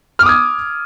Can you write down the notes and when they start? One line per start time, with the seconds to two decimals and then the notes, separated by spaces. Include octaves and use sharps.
0.19 F6
0.22 D6
0.26 D#6
0.29 G#6